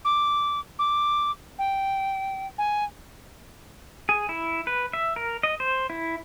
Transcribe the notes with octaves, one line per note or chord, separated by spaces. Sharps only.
D6
D6
G5
G#5
G#4
E4
B4
E5
A#4
D#5
C5
E4